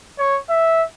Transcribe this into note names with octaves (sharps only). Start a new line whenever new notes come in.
C#5
E5